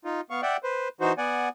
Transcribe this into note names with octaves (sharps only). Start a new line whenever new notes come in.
D#4 F4
B3 F5 C#6
D5 E5 F#5 G5
B4 C5
E3 D#4 F#4 C5
B3 D5 F#5 G#5